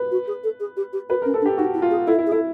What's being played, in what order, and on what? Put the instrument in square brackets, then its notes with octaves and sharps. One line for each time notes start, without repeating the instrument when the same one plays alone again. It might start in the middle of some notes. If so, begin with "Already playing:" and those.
Already playing: [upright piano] B4
[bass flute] F#4
G#4
A4
G#4
G4
G4
[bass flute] F#4 [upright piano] B4
[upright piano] A#4
[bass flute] C#4
[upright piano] A4
[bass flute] D4
[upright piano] G4
[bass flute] D#4 [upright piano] F#4
[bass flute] E4
[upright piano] F4
[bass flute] G#4
[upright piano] E4 [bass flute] A4
[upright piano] E4
[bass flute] G#4
[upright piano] E4 [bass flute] A4